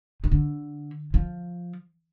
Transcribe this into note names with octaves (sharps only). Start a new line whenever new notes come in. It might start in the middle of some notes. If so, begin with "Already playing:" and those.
D#3
D3
F3